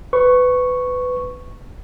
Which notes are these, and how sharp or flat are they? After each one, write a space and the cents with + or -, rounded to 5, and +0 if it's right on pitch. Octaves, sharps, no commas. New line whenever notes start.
B4 +20 C#6 -5